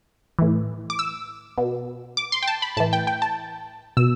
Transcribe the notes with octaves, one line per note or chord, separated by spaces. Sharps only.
A2 E3
D6
E6
B2
D6
C6
G5
A5
B5
A2 E3 A5
G5
G5
A5
B2 E6